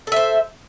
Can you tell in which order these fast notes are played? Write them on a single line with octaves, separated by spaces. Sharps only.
A4 E5 C5